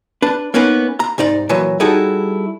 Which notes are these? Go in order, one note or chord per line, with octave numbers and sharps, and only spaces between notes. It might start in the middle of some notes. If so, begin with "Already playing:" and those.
D4 B4
A#3 B3 C#4 D#4 B4
A#5
C2 G#2 D#4 D5
A#2 E3 F#3
G3 D#4 E4 F#4 G#4 A4